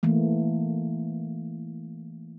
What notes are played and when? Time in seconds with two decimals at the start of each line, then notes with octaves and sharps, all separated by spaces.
0.03 E3 A3 A#3